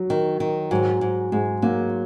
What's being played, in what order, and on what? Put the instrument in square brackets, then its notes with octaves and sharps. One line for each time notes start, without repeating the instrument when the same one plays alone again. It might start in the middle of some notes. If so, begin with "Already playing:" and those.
Already playing: [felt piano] F#3
[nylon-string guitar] D#3
D#3
[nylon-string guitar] G#2 [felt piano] F#3
[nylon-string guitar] G#2
[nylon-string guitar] G#2 [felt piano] G#3
[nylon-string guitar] F#3 [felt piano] A#3